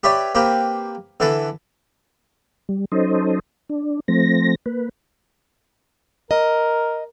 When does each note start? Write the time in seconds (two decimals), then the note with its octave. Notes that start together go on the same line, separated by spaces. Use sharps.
0.03 G4 B4 C#5 D5 E5
0.35 A#3 C4 G4 B4
1.20 D3 E3 A4 B4 A5
2.69 G3
2.92 F#3 C#4 D#4 A4 C5 D#5
3.69 D4
4.08 F3 A3 C4 A#6
4.66 A#3 B4
6.31 A#4 D#5